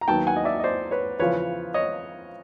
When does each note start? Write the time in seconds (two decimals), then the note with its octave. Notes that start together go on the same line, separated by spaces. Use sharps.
0.01 A#5
0.08 D#2 D#3 F#3 B3 G5 A5
0.27 F#5 G#5
0.36 D#5
0.45 D5 E5
0.60 D#5
0.64 C5 D5
0.91 B4 C#5
1.19 E2 C#3 F3 B4 C#5
1.74 C#5 D#5